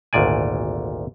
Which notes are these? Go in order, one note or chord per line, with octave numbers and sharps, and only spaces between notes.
G#1 D2 A#2 D5 G#5